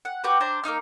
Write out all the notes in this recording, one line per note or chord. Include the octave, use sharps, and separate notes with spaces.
F#5
F#4 G4 B4
D4 C5 A#5
A#3 C#4 D#4 F6